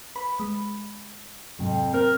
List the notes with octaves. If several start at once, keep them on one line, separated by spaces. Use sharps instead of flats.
B4 B5
G#3 B5
F2 G#2 C3 F#3
C4 A#4